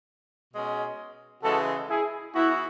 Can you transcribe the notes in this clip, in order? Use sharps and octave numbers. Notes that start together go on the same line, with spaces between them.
B2 G#3 C#4
C#3 E3 G#3 F#4 A4
E4 G#4
E3 B3 E4 F#4